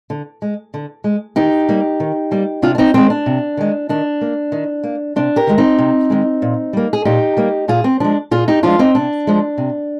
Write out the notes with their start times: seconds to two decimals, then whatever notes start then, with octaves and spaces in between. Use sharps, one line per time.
0.10 D3
0.42 G#3
0.74 D3
1.04 G#3
1.36 D#3 D#4 G4
1.69 G3 A#3
2.00 D#3
2.31 G3 A#3
2.62 C3 D4 F4
2.75 D4
2.78 C4 D#4
2.94 D#3 G#3 C4
3.10 D4
3.26 C3
3.57 D#3 G#3
3.89 D#3 D4
4.21 A#3
4.52 D#3
4.84 A#3
5.16 C3 D4
5.36 G4 A#4
5.47 D#3 G#3
5.58 C4 D#4
5.78 C3
6.10 D#3 G#3
6.42 A#2
6.73 G3 A#3
6.93 G#4
7.05 A#2 D#4 G4
7.37 G3 A#3
7.68 A#2 F4 G#4
7.84 C4
8.00 F3 G#3 D4
8.31 A#2 F4 G#4
8.48 D#4 G4
8.63 F3 G#3 D4 F4
8.79 C4 D#4
8.95 C3 D4
9.27 F3 G#3
9.58 C3